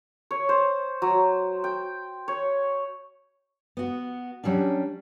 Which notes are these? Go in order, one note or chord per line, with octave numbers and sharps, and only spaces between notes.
C#5
C5
F#3
G5
C#5
B3 F#4
F#3 G3 C#4 D4